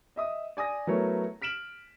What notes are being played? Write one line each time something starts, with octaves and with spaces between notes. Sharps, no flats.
D#5 E5 D#6
D5 G#5 D#6 A#6
F#3 A3 B3 E4 A#4 C#5
F6 B6 D7 E7 F#7